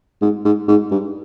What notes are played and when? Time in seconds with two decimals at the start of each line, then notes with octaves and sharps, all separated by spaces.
0.22 G#2
0.45 G#2
0.68 G#2
0.91 G2